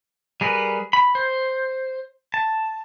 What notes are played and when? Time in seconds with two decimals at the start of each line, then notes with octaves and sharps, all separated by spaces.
0.41 G3 G#4 A#4 B4
0.93 B5
1.15 C5
2.34 A5